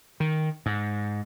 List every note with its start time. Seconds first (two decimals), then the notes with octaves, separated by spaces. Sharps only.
0.20 D#3
0.66 G#2